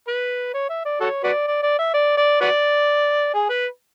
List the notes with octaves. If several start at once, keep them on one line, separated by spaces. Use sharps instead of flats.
B4
C#5
E5
D5
F#4 A4 C#5
F#4 B4 D5
D5
D5
E5
D5
D5
F#4 B4 D5
G#4
B4